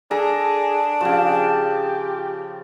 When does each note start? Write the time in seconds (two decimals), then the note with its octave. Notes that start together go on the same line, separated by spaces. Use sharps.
0.11 D4 G#4 A4 A#5
1.01 C#3 F3 G4